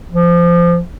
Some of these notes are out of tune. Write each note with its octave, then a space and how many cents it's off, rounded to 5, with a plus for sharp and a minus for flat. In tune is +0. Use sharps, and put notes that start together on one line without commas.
F3 -20